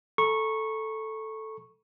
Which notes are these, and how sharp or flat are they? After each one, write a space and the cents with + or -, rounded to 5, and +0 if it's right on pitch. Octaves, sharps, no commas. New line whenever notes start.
A4 +0 A#5 +45 C#6 -15